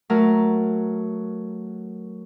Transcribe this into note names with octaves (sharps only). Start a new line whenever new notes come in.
F#3 A3 A#4